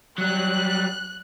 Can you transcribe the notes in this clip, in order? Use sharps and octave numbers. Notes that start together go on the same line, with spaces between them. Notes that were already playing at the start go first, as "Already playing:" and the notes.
F#3 G3 F#6